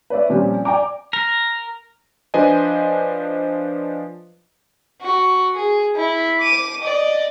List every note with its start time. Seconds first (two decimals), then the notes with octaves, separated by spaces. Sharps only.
0.10 B4 C#5 D5 E5
0.29 A#2 F3 G3 C4 C#4
0.65 D5 G5 G#5 A#5 D6
1.13 A#4
2.34 F3 D4 B4 C5 D#5 G#5
5.01 F#4
5.55 G#4
5.96 E4
6.40 D6 D#7
6.82 D5 D#5